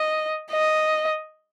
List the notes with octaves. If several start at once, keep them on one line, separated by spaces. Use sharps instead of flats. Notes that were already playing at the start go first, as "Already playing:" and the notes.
Already playing: D#5
D#5